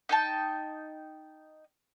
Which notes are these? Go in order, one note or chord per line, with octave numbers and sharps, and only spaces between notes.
D#4 G5 A5